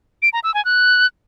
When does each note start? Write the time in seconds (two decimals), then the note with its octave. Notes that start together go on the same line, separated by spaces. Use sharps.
0.22 D7
0.33 A#5
0.44 E6
0.54 G#5
0.65 F#6